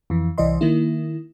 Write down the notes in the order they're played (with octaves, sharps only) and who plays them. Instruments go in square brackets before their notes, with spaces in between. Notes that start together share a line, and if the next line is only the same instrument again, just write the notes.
[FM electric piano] F2 E3
C2 E3 D5 D#5 C6
D#3 A#3 E4